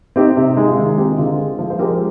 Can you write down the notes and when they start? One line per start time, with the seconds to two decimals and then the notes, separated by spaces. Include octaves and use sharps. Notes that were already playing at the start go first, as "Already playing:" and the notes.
0.16 C4 D#4 G4
0.37 C3
0.57 G#3 D#4
0.67 F4
0.76 D#3 D#4
0.98 C4 D#4 G4
1.18 D3 F4 G#4
1.38 G#3
1.59 F3
1.70 C5
1.79 G#3 G4 A#4